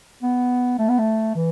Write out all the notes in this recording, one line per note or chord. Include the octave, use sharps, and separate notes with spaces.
B3
A3
B3
A3
E3